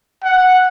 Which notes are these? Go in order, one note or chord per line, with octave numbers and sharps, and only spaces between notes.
F#5